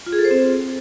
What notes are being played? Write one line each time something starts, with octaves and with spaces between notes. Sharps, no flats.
F4
G#4
A4
C5
C4